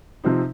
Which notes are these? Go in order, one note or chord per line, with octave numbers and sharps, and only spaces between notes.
C3 F3 C4 D#4